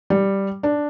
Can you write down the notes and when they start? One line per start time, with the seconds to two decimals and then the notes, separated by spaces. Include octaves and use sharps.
0.10 G3
0.63 D4